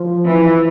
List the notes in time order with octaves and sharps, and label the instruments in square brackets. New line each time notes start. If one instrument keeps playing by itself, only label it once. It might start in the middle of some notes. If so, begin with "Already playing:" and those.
Already playing: [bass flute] F3
[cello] E3